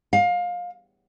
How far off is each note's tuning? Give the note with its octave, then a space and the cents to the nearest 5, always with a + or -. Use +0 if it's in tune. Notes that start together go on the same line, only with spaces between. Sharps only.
F5 +25